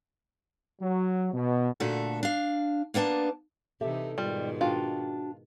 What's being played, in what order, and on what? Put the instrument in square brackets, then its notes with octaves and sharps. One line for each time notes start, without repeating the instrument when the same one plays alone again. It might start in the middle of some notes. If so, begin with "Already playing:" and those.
[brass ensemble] F#3
B2
[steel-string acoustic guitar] A#2 D3 A3 F#4 A4
D4 F5
A#3 B3 D4 F#5 A5
[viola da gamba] C3 E3 D#4 [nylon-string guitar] G4 A4 E5
[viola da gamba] G#2 B2 D#3 [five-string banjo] G3 [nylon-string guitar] F4
[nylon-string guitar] D4 F#4 G5 [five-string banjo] F4